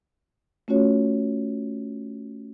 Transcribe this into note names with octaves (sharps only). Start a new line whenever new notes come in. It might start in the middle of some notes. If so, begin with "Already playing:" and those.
A3 C#4 F4 F#4 C#5